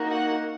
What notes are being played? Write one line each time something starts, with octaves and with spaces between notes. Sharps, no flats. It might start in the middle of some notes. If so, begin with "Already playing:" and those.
Already playing: A#3 D#4 F#4
F#5